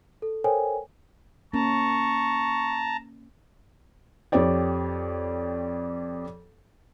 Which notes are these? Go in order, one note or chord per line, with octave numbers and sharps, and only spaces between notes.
A4
A4 A#4 C5 C#5 G5 G#5
A#3 C#4 A5 A#5 C#6
F2 G4 C#5 D5 G5